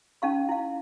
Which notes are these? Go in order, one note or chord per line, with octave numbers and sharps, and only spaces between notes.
C#4 D#4 F5 C#6
E4 F5